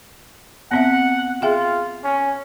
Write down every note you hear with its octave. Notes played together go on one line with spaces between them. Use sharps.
B3 C4 E5 F#5
F4 G#4 E5 G5
C#4